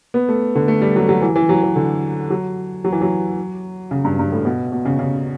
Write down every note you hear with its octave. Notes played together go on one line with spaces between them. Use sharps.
B3
A3
D3
A3
G3
F#3
F#3
E3
E3
F#3
E3
D3
F#3
F#3
E3
F#3
C#3
G2
G2
A2
B2
B2
C#3
C#3